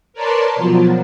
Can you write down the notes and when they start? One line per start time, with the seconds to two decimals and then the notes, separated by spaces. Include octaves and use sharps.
0.13 A#4 B4 C#5 D5 A5 C6
0.56 B2 F3 F#3